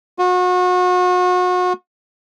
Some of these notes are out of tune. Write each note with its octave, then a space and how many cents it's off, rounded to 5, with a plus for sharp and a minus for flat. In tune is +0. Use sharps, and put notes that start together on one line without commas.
F#4 -35